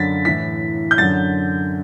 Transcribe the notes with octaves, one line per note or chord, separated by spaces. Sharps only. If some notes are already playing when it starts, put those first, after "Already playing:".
Already playing: F#2 D3 A6 B6
A2 E3 B6
G6
F#2 D3 A6